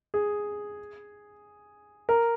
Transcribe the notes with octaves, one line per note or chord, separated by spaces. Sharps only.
G#4
A#4